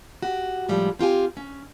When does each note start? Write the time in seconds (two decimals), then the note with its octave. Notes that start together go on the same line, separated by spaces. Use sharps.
0.22 F#4 G4
0.69 A2 F3 G3 G#3
0.99 C4 F4 G4 G#5
1.37 C#4